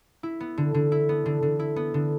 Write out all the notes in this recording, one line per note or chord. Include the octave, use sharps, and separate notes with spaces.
E4
B3
D3
D3
E4
B3
D3
D3
E4
B3
D3